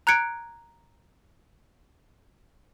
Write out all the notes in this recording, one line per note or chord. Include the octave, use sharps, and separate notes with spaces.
A#5 F#6 G#6 C#7 D7